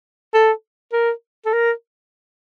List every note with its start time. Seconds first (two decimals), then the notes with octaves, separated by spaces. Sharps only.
0.34 A4
0.92 A#4
1.45 A4
1.53 A#4